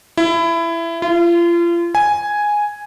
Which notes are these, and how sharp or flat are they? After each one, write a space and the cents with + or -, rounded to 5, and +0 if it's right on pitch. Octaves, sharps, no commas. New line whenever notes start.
E4 +20
F4 -35
G#5 +0